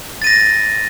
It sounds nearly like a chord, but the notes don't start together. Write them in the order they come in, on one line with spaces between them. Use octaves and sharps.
A6 D#7 A#6